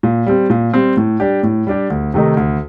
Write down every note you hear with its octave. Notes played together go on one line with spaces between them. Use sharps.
A#2
G3 C4
A#2
G3 C4
A2
G3 D4 G4
A2
G3 D4 G4
D2
C3 D#3 A3 D#4
D2